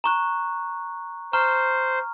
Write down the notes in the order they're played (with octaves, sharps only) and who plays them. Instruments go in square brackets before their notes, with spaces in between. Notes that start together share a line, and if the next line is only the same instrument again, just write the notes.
[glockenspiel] A#5 C#6 F#6
[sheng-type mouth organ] C5 [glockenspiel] A#5 C#6 F6